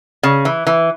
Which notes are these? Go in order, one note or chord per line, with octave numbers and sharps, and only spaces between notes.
C#3
E3
E3